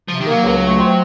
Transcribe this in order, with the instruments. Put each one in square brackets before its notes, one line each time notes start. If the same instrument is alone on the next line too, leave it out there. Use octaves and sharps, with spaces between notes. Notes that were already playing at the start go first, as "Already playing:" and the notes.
[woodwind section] C3 [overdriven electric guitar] F3
[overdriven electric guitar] D#3
[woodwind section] A#3
[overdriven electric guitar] F#3
[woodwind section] C#2
A3
C4